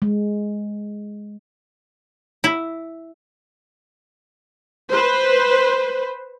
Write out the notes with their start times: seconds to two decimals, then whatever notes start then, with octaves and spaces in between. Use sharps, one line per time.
0.02 G#3
2.44 E4
4.91 B4 C5